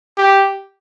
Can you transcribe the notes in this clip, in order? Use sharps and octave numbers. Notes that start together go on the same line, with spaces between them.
G4